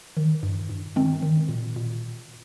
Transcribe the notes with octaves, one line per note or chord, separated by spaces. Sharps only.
D#3
G2
G2
D#3 G#3 C4
D#3
A#2
A#2